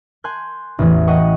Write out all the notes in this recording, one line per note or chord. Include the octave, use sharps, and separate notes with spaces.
G#5 C6 F#6 G6
A1 E2 E3
D#5 F#5 G5 C#6 D#6